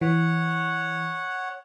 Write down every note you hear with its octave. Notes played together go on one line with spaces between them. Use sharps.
E3 C#5 F#5